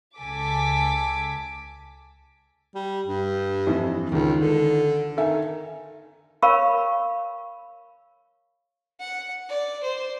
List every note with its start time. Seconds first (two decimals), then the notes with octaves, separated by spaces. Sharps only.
0.18 C#2 A4 G#5 D6 B6
2.75 G3
3.06 G2
3.67 F2 E3 E4
4.12 C#2 D#3
4.39 D3
5.17 D#3 A4 E5 G#5
6.42 A#4 C#5 F5 B5 C#6
9.00 F#5
9.49 D5
9.83 C5